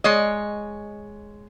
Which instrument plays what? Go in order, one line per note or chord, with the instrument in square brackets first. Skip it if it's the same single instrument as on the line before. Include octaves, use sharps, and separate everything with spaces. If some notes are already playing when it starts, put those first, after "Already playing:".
[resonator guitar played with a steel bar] G#3 C#5 D#5